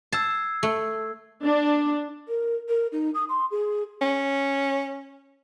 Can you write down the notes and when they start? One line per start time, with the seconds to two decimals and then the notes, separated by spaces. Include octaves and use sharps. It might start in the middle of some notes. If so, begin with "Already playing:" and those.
0.12 A5 E6 G#6 C7
0.63 A3
1.44 D4
2.29 A#4
2.69 A#4
2.92 D#4
3.15 D#6
3.29 C6
3.51 G#4
4.01 C#4